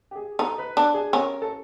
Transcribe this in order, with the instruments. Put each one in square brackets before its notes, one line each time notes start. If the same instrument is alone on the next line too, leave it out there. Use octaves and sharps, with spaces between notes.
[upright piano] G4
G#4
[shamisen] D#4 [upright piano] A4
[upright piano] B4
[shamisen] D4
[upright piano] G#4
[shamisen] C#4 [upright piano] A#4
[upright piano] A4